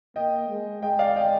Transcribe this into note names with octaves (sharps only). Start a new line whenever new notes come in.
A#3 D#5 G5
G#3
G#3 D#5 G5
D5 F5
D#5 G5